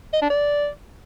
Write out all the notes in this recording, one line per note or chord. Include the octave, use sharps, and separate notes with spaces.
D#5
D4
D5